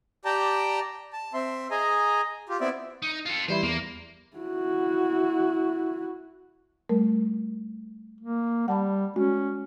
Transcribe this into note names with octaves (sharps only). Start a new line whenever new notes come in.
G4 D5 G5 A5 A#5
A5
C4 E5 C6
G#4 D#5 G#5 A#5
F4 G4
B3 C4 E4 D5 E5
D#4
F4 A4
E3 G3 E4 C5
E2 A#3
E4 F#4
G3 A3 A#4
A#3
G3 F#5 A5 B5
G#3 C#4 F#4